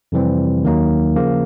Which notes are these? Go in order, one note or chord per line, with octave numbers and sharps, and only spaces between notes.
F2 C3 E3 G3 C4
D#2 D#3 F#3 A#3 D#4
C#3 F3 A#3